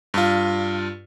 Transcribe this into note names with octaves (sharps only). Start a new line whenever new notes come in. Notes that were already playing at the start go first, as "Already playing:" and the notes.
G2 F4